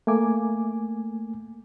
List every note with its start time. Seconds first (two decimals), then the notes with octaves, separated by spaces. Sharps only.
0.07 A3 A#3 G#5 D6